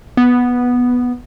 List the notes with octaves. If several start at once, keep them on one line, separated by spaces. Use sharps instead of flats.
B3